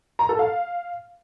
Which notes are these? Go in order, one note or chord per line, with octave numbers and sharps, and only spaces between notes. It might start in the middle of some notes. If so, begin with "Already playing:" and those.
A#5
A4
F5